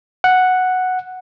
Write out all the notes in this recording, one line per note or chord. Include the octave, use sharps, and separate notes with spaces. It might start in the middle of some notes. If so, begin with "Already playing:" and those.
F#5